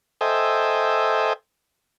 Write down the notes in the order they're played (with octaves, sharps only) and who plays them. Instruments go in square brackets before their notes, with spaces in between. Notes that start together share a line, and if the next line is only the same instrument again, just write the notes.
[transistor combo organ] A4 C5 D#5 E5 G5 G#5